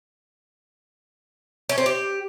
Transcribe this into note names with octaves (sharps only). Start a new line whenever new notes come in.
C#4
C4
G4